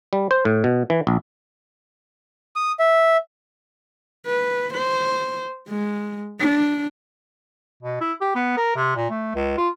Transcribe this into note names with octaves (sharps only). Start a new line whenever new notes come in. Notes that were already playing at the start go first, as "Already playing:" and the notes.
G3
C5
A2
B2
E3
A#1
D#6
E5
B4
C5
G#3
D4
B2
E4
G4
B3
A#4
C3
A#2
A3
C#2
F4